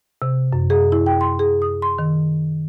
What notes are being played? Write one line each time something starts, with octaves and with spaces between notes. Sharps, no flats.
C3
F#2
G#4
E4
G5
C6
G#4
D#6
C6
D#3